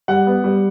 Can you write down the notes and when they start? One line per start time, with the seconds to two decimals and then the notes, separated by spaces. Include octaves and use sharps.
0.08 G3 F#5
0.27 B3
0.44 G3